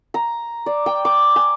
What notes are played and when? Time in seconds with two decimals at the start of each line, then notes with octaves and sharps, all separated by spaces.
0.14 A#5
0.66 D5
0.86 G5
1.05 D6
1.36 G#5